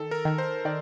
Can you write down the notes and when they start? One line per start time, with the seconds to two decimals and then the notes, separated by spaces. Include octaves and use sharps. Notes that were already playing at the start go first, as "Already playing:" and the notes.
Already playing: D#3 A4
0.11 A#4
0.25 D#3
0.38 C5
0.65 D#3 D5